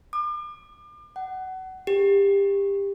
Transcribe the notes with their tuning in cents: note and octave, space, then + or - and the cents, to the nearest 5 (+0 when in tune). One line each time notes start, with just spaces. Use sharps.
D6 +40
F#5 +25
G4 +25